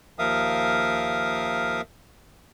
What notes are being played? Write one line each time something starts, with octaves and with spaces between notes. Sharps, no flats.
D#2 F3 A#4 E5 F5 D#6